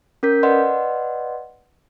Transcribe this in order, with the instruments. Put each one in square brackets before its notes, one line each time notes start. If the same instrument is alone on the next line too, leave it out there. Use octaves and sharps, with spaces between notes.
[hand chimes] C#4 A#4 G6 B6
B4 D5 D#5 F#5 C6